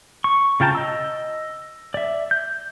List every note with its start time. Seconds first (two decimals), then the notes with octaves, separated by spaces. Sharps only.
0.24 C#6
0.60 C#3 F4 G5 A5 A#5
0.75 D#5 E6
1.94 D5 E5
2.31 G6